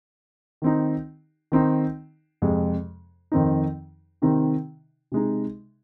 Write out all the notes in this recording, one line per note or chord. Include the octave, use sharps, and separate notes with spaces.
D#3 C4 D#4
D#3 C4 D#4
F2 C3 G#3
F2 D#3 C4 D#4
C3 D#3 C4 D#4
C3 G#3 D#4